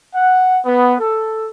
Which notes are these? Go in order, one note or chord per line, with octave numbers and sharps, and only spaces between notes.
F#5
B3
A4